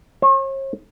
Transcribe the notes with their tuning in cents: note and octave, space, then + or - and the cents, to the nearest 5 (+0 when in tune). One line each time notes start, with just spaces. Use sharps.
C#5 -45 G#5 +0